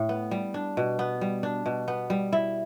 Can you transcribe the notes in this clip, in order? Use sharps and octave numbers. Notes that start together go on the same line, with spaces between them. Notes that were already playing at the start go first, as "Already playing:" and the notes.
Already playing: A2
B3
G3
D4
B2
B3
G3
D4
B2
B3
G3
E4